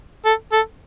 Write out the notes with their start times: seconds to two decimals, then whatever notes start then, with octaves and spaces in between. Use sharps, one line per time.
0.25 A4
0.52 A4